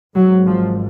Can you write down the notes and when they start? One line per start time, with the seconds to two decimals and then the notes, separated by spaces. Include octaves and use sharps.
0.15 G#1 G#2 F#3
0.46 F3